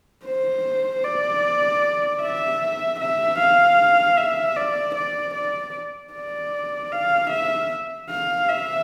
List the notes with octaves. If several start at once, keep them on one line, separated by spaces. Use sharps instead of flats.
C5
D5
E5
E5
F5
E5
D5
D5
D5
D5
F5
E5
F5
E5